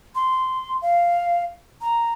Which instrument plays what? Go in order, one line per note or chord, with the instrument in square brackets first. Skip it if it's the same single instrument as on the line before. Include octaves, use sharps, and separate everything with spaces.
[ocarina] C6
F5
A#5